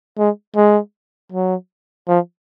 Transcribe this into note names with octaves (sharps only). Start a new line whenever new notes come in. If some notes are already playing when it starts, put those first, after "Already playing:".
G#3
G#3
F#3
F3